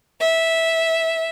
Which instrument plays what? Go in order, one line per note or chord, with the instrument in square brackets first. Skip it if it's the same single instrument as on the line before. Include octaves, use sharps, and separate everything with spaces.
[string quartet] E5